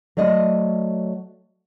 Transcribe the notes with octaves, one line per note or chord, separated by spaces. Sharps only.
F#3 A3 D5 D#5